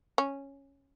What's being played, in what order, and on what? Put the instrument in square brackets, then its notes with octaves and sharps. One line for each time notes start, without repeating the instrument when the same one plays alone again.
[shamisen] C#4